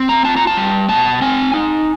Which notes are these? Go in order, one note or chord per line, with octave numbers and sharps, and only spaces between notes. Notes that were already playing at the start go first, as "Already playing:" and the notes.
Already playing: C4
A#5
F4 A5
A#5
A5
G3
B2 A5
C4 G#5
D#4